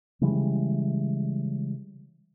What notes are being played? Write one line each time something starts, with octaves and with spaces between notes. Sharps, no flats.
C#3 E3 G3 G#3